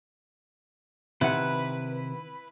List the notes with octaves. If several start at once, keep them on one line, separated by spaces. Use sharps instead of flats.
C3 D#3 E4 B4 F#5